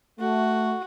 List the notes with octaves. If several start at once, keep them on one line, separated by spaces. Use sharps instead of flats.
A3 F#4